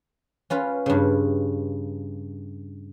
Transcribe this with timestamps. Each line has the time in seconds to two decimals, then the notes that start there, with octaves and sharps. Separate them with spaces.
0.50 C#4 F4 B4
0.86 G2 C#3